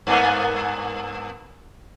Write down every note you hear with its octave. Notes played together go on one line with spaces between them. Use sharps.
G2 A#3 B3